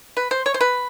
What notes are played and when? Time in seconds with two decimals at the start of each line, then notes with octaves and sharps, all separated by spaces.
0.17 B4
0.31 C5
0.46 C#5
0.54 C5
0.61 B4